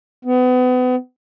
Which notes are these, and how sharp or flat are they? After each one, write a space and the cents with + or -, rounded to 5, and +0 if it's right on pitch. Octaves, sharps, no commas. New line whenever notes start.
B3 +35